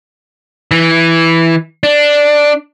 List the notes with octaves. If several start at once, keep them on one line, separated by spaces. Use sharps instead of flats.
E3
D4